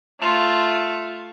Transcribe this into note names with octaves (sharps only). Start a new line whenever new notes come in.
A3 F4